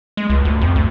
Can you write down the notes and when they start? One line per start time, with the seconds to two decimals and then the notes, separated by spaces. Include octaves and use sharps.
0.17 G#3
0.30 C#2
0.45 D2
0.61 F2
0.76 D2